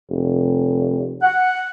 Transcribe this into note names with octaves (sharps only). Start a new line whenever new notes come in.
F1
F#5